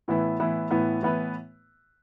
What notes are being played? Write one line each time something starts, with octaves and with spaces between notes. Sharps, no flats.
A2 E3 B3 E4 B4
A2 E3 B3 E4 B4
A2 E3 B3 E4 B4
A2 E3 B3 E4 B4